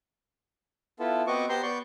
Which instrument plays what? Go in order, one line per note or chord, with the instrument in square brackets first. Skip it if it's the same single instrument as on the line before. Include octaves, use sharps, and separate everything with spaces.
[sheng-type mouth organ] B3 E4 F4 A4
B3 C4 F#4 D#5 C#6 D6
B3 G4 C5 A#5 C6 G6
B3 D5 C#6 G6